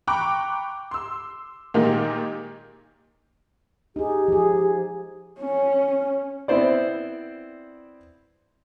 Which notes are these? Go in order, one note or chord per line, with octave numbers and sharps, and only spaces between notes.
G5 A#5 B5 C#6 D6 F#6
C6 E6
A#2 D#3 G#3 A#3 D#4 G4
D#4 G4 G#4
F3 G#4
C#4
B3 C4 E4 C5 D5